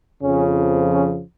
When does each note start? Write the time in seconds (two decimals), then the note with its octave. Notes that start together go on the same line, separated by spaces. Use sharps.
0.22 F2 C#3 F3 C#4
0.92 C#4